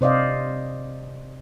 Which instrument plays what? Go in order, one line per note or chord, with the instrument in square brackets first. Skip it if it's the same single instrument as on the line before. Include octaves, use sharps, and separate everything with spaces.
[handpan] C3 C5 D5 D#5 F5